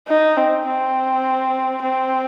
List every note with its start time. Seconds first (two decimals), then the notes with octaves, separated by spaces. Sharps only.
0.08 D#4
0.37 C4
0.66 C4
1.82 C4